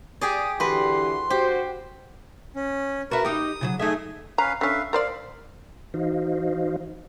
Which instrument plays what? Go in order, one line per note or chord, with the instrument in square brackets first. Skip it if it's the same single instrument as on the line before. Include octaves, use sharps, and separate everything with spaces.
[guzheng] G4 G#4 D5 [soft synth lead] D#6
[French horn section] D3 E3 G4 [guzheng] F#4 B4 [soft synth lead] C6
[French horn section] F#4 C5 [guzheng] G4
[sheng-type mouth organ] C#4
[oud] F#4 E5 [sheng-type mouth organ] A#4 B4
[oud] D#4 G4 [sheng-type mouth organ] D#6
[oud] C#3 F3 F#3
[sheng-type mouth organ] A3 G#4 G#5 [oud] D#4 E5
[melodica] C#4 B4 F5 [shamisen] A#5
[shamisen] D3 C#4 [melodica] B4 E5 F5
[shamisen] A#4 C5 D5 [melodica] F5
[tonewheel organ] E3 D#4 F#4 C5 D#5 F5